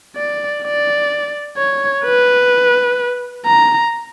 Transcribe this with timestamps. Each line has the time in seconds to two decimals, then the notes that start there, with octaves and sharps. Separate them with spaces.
0.16 D5
0.64 D5
1.57 C#5
2.04 B4
3.46 A#5